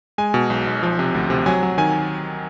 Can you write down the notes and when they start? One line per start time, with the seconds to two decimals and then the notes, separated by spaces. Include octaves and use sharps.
0.18 G#3 G#5
0.34 B2
0.50 B1
0.67 B1
0.83 F3
0.99 C3
1.14 D2
1.30 C3
1.46 F#3 G#5
1.63 F#3
1.78 D#3 G#5